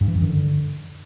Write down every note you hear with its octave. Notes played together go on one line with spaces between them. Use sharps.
G2
E3
F#2
D#3
D3